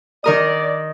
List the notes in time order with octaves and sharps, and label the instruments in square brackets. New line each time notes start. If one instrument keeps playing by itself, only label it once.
[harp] D#3 A#4 D#6 [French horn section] D5